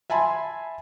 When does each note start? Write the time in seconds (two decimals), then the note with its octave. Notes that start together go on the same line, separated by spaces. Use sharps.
0.10 E5 G#5 A5 B5 C6